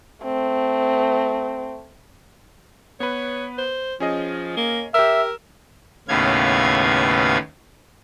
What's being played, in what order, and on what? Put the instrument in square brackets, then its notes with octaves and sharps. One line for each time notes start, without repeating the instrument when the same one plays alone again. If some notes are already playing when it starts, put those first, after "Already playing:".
[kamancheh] A3 C4
[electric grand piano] B3 B4 [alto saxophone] C#5
[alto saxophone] C5
[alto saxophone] F3 [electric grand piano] C#4 G#4 D#5
[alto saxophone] A#3
[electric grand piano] G4 E6 [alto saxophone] A#4 [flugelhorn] E5
[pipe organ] D#2 A2 C#3 B3 F5 G#6